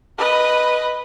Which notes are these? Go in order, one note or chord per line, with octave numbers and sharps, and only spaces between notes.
B4 D#5